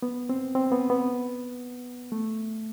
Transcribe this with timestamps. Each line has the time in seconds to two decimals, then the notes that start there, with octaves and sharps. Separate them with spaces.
0.02 B3
0.29 C4
0.55 C4
0.72 B3
0.90 B3
2.12 A3